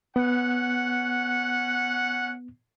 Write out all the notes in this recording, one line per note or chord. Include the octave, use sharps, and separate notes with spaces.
B3 C#4 F#5